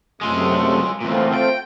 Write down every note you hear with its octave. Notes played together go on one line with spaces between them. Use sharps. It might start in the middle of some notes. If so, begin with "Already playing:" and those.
F#2 C3 G#3 A3 F4
E2 A#2 A3 C4 F4
G5